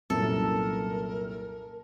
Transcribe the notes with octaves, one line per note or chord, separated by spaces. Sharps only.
C2 F#2 A#2 A4 A#4